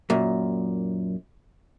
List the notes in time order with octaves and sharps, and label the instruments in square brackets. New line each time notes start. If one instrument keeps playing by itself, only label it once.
[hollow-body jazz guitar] F#2 A#2